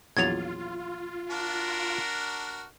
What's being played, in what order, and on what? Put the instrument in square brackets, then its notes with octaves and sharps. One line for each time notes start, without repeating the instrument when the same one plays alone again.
[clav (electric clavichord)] A#1 E2 F#3 [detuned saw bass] F4 [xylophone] G#6 A6 F7
[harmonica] D4 F#4 A#4